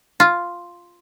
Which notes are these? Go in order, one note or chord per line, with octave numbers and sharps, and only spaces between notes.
F4